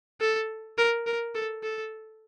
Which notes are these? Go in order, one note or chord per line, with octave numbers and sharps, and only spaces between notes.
A4
A#4
A#4
A4
A4